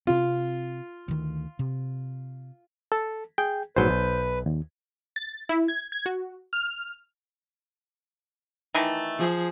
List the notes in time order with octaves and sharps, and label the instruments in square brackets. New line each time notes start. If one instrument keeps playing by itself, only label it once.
[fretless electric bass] C3 C4 [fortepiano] F4
[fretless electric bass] D2 D#3
C3
[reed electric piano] A4
G#4 G5
[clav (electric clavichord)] A#1 G#2 F#3 [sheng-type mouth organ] B4 [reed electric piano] C5 G6
[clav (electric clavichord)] B1
[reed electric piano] D#2
[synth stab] A6
E4
G#6
G#6
F#4
F6
[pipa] D#3 E3 A3
[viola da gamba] F3 G#4